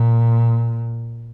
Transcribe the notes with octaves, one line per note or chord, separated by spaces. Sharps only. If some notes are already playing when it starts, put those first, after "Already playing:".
Already playing: A#2